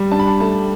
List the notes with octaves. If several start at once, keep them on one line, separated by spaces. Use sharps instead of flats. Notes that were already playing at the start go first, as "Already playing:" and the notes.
Already playing: G3
D4 A5
B5
A5
A3 A5